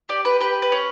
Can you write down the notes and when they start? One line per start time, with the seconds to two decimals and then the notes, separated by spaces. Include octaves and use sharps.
0.09 G4 D5
0.25 B4
0.41 G4 B4
0.62 B4
0.72 C#4